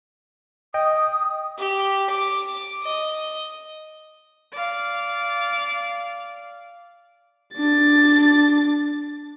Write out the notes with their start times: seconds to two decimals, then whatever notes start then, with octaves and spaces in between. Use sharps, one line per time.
0.74 D#5 G5 D#6
1.58 G4
2.10 D6
2.82 D#5
4.52 D5 F5
7.54 D4 A6